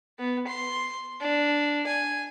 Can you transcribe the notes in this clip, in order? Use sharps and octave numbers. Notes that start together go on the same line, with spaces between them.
B3
C6
D4
G#5